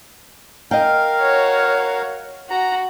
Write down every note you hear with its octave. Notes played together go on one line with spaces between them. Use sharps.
A#4 D#5 F5 G5
F#4 C#5
F#4 A#5